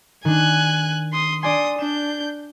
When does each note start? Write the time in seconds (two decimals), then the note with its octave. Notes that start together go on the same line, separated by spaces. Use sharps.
0.25 D#3 D4 G#5 F#6
1.13 C6 D#6
1.43 D4 D5 G#5 C6 D#6
1.79 D4 G6 E7